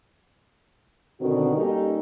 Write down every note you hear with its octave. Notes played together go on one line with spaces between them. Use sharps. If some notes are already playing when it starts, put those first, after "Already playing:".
B2 D3 D#3 C4 F#4
G3 A#3 C#4 D#4 G4 A4